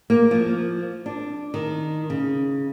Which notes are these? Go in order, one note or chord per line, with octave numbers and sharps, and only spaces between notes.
A#3
F3
D4
D#3
C#3